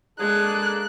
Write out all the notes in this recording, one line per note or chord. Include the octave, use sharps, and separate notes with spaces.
G#3 A#3 D4 G#4 A4 F#6